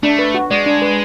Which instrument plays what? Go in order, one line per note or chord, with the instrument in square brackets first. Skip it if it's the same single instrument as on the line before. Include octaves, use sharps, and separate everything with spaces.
[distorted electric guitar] A3 [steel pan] D4
[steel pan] B4
F#4
[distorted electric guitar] G#3 [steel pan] D5
[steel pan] D4
B4